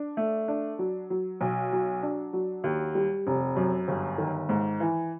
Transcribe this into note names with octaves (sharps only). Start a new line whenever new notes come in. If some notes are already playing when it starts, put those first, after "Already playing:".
Already playing: D4
A3
D4
F#3
F#3
B1
F#3
D4
F#3
D#2
G3
F1
F#2
G1
D#3
G#2
E3